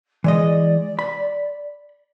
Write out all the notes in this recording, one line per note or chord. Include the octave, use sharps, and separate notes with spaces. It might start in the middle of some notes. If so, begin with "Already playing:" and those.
E3 G#3 D5 D#5
B5